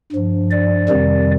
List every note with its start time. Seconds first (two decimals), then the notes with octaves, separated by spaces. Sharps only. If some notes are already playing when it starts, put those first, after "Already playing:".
0.12 G2 F3
0.51 D5
0.88 F2 C3 D#3 G3